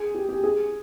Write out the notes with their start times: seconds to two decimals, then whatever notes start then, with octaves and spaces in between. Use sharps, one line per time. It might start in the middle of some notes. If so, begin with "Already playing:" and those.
Already playing: G#4
0.15 G4
0.29 G4
0.44 G#4